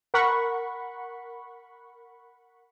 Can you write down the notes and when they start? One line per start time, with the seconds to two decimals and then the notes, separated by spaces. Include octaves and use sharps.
0.14 A#4 F#5 B5 C#6